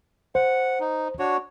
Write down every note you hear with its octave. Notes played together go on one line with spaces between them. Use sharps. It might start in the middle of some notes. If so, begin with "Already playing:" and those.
C5 F#5
D#4
D4 F#4 C#5